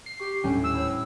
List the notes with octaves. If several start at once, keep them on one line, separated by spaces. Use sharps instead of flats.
C7
G4 C#6
D#1 A2 G3 C#4 D4 G#5
E6
C5 C#5 B5